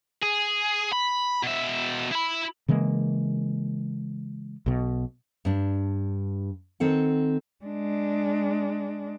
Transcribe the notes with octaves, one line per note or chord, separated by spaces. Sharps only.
G#4
B5
B2 E5
E4 B5
C#3 E3 G#3 A#3
B1 B2
G2 D4
D#3 C4 A4 F#5
G#3 D4